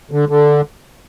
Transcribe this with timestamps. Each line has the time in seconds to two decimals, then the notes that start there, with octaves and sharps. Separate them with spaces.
0.11 D3
0.29 D3